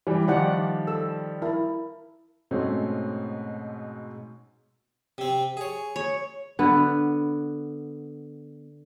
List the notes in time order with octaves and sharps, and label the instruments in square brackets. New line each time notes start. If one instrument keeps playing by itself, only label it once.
[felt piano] E3 G3
[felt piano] D#3 F3 G3 [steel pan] D5 F#5
[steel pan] A4 E6
E4 A#4 A5
[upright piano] G#2 B2 A3 C4 C#4
[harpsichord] C3 C4
G#4 C#5
[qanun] C#5
[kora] D3 B3